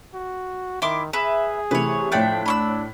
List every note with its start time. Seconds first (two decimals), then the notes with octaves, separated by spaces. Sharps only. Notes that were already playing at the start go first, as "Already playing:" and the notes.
0.14 F#4
0.82 D#3 E4 C6 D6
1.13 G#4 B4 E5
1.71 C3 E3 A3 B4 C#5
2.12 A2 F3 A3 D4 C#5 G5 F#6
2.46 D4 B5 C#6 E6